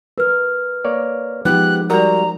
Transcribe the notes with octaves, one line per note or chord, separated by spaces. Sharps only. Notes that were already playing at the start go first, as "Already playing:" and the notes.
A#4 B4 F6
A#3 C#5 D5
F3 G#3 B3 D#4 G4 F#6
G3 F#4 A#4 D5 F#5 A#5